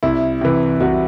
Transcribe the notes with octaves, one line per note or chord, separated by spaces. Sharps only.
C2 E4
C3 E3
C2 F#4